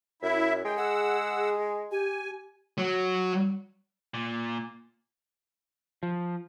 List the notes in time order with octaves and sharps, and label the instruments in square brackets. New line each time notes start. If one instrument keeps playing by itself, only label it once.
[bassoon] F#2 [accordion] E4 E5
[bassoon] G#3 [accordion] G5
[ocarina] G#4 [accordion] F#5 E6
[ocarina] G4 [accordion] G#5
[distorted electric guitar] F#3
[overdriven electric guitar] A#2
[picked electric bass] F3